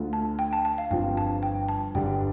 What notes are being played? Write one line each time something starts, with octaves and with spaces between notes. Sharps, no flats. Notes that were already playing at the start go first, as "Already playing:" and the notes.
Already playing: D2 D3 A3 F4
A5
G5
A5
A5
F5
G1 G2 F3 C4 F4 G5
A5
G5
A5
G1 G2 D3 G3 D4 G5